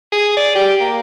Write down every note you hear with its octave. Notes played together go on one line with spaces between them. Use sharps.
G#4
D5
G4
A#3